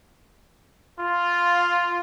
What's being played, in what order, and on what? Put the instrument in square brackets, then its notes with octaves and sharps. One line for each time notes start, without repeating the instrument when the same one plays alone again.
[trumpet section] F4